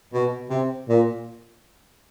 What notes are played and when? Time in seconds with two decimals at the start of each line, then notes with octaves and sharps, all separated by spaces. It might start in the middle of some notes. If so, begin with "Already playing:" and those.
0.14 B2
0.51 C3
0.89 A#2